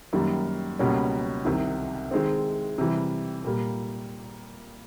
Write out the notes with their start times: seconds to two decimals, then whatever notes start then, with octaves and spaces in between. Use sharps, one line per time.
0.13 F#2 D#3 G3 A#3
0.79 C#2 B2 G3 A#3 C#4
1.45 C2 C3 D#3
2.11 D#3 G#3 C4
2.78 C3 E3 G3
3.45 A#2 G3 A#3